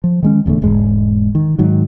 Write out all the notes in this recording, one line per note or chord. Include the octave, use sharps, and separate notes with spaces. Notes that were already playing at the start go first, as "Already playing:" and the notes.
F3
D#3 G#3 C#4
D#1 E2 D3 A3
E1 G#2 G#3
D#3
G#2 D#3 F#3